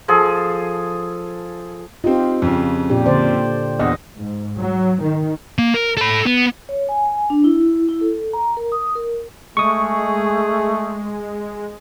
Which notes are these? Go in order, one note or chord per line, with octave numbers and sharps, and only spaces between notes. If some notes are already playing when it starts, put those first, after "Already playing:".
F3 G#4 A4
C4 D#4 F4 G4
F2 C#3
A#2 D4 G4
D3 C5 D5
E2 D3 D#5
G#2
F#3
D#3
A#3
A#4
A4 B5
B3
C#5
G#5
D4
E4
E4
A4
A#5
A#4
D#6
A#4
G#3 A3 G#4 C#6 D#6